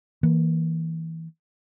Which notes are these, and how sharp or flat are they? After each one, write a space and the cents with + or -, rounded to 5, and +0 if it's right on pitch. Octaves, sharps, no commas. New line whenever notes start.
E3 -20 A#3 +0